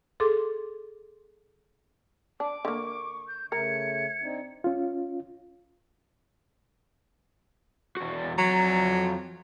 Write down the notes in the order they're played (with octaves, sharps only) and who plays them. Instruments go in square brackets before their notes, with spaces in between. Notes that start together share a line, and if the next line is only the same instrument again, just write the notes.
[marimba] G#4 A4 C6 D6
[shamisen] D4 [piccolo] D6
[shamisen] D3 A#3 [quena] C#6
[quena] G6
[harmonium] C#3 A3 [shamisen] A#4 [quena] G#6 [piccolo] C#7
[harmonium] C4 D4 D#4
[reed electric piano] C#4 F4
[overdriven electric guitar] E2 F#4
[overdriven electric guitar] F2 A#5 [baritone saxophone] F#3